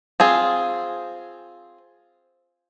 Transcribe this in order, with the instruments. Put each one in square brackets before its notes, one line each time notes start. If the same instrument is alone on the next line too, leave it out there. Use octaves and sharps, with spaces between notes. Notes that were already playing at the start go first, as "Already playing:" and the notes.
[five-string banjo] C4 F4 G#4